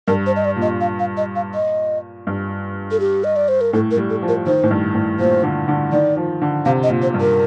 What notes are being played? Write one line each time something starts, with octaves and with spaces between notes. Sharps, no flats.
G2 A#4
C5
D#5
D5
A#2
D#5
F5
F5
D#5
F5
D#5
G2
A4
G4
D#5
D5
C5
A#4
A2 A4
A#4
G3
A4
F3
A#4
D#3 C5
A2
G2
A2
A#2 C5
D3
D3
D#3 D5
F3
D3
C3 F5
D#5
A#2
C5
G2
A#4